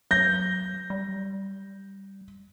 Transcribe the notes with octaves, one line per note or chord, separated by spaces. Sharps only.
F#3 G6 A#6
G3